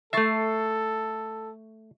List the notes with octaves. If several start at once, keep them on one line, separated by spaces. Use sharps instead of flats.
A3 A4 E5 C#6 A6 C7